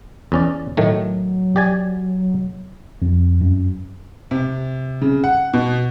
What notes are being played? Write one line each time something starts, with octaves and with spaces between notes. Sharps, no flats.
E2 C#4 D5
A2 D#3 F#3 A3
G4 D5 G#5
F2
F#2
C3
C#3
F#5
B2